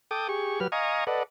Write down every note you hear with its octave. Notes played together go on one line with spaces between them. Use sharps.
A4 G5 D6 D#6
G4 G#4 C#6
F#3 G4 B4 F6
D#5 F5 G#5 A#5 C#6 D#6
A4 B4 D5 D#5 F#5